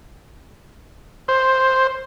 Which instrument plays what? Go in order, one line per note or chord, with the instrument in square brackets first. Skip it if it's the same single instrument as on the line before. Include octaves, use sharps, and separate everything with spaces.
[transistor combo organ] C5